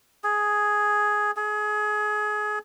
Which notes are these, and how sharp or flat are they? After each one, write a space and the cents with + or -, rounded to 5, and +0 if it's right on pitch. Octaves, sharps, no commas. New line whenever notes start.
G#4 +5
G#4 +25